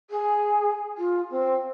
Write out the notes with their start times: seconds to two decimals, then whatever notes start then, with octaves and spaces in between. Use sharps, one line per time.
0.10 G#4
0.98 F4
1.30 C4